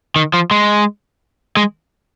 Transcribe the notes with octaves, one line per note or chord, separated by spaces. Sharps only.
D#3
F3
G#3
G#3